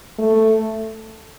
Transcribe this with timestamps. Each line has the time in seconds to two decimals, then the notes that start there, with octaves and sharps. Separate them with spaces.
0.19 A3